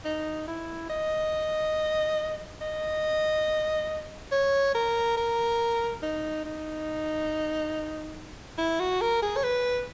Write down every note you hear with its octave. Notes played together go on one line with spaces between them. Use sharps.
D#4
E4
D#5
D#5
C#5
A#4
A#4
D#4
D#4
E4
F#4
A#4
G#4
C#5
B4